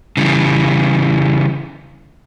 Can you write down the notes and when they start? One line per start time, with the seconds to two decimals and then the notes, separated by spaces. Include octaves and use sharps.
0.17 C#3 E3 G3